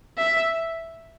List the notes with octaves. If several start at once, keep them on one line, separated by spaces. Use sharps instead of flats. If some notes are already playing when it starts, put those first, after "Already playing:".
E5